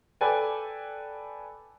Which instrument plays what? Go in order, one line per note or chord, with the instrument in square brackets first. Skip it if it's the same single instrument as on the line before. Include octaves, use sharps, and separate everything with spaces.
[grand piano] A4 B4 D5 G5 G#5